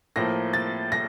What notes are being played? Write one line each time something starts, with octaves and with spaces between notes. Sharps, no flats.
A2 F3 A#3 A#6
A6
A#6